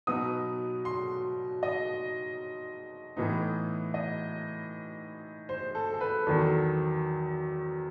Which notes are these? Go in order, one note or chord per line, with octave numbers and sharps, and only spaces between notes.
B2 F#3 B3 D#4 D#6
C6
D#5
A2 E3 B3 D#4
D#5
C5
A4
A4
B4
E2 D#3 F#3 A4